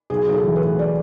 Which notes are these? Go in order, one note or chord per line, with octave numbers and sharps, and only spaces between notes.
B1 G#4
B1
A4
E3
B4
A2
D5